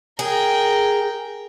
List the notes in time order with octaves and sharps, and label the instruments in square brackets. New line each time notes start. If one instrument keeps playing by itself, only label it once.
[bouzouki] G#4 [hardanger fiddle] A#4 G5